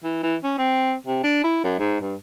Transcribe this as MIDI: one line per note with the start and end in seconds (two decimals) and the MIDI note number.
0.04 0.20 52
0.23 0.36 52
0.44 0.54 61
0.58 0.93 60
1.07 1.21 48
1.23 1.41 62
1.44 1.60 64
1.64 1.77 42
1.79 2.00 44
2.01 2.15 43